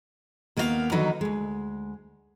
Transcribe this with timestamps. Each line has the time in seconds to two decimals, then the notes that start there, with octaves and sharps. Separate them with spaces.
0.57 D#2 A#3 B3 E4 F5
0.92 D3 D#3 F#3 D#4 F#4 B4
1.21 D2 G#3